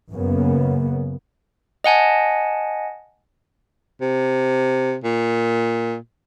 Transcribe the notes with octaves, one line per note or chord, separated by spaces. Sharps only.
F#2 C#3 A#3 B3
D#5 F#5 G#5 A5
C3
A#2